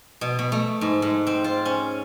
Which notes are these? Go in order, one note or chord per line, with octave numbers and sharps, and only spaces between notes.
B2
B2
A3
G#2
G#2
C4
F4
C#4